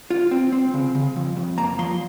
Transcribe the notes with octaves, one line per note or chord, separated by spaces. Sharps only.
F4
C4
C4
C#3
C#3
F2
F2
A#3 A#5
F3 C6